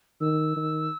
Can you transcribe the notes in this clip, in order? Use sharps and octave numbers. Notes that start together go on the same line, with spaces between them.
D#3 E6
D#3